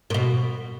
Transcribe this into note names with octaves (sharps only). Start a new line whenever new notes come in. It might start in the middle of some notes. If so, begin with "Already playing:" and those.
A#2
B2